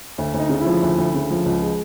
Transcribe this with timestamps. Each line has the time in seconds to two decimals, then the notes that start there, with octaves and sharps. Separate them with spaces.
0.18 D2
0.34 D2 D#4
0.49 C#3
0.61 E4
0.66 F3
0.82 D2
0.98 D2
1.14 C#3
1.30 F3
1.46 C#2
1.62 G#3